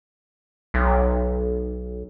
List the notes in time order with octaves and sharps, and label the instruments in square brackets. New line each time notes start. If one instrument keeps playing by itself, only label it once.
[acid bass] B1